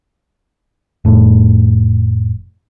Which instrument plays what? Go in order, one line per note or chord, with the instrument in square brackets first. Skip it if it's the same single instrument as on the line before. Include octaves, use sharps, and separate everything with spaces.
[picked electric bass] F1 A2